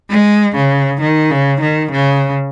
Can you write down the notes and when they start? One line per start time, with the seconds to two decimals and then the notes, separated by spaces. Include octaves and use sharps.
0.11 G#3
0.55 C#3
1.01 D#3
1.31 C#3
1.61 D#3
1.91 C#3